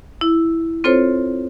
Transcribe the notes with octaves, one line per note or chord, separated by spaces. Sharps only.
E4
C4 F4 A4 C5 C#5